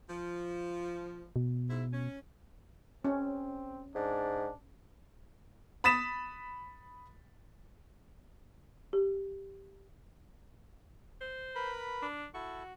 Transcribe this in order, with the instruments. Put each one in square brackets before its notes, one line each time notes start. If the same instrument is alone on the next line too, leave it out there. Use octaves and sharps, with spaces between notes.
[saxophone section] F3
[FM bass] B2
[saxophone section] G#2 E4
C#4
[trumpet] C4 [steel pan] C#4
[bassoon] G#2 [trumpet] D4
[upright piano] B5 D#6 A6 B6 E7
[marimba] G4
[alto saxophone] C5
[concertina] A#4 B4 B5
[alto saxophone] D4
[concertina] E4 A4 C#6 [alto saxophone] F#4